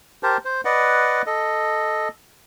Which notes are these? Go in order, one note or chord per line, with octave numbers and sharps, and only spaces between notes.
G4 A#4 C5 A5
C5
B4 D5 D#5 F#5
A4 D#5